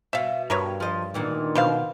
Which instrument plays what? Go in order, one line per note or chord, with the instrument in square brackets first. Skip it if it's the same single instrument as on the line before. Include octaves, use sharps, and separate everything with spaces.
[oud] B2 [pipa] E5 F5
[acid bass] G2 [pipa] A#4 B4 C#5
[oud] F3 D#5
[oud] D2 A#2 E3 [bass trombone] D#3
[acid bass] B2 [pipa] B4 C5 F5